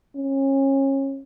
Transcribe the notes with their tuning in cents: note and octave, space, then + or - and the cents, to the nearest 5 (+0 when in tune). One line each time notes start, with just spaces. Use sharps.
C#4 -30